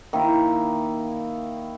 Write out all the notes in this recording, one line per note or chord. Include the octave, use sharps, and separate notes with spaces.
D#3 A#3 E4